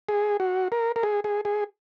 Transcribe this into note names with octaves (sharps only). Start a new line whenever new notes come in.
G#4
F#4
A#4
A#4
G#4
G#4
G#4